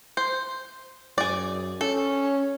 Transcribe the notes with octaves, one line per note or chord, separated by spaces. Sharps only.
C5
F#2 G#4 D5
C#4 A4